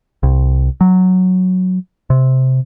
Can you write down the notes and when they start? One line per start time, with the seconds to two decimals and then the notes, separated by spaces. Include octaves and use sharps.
0.23 C2
0.81 F#3
2.10 C3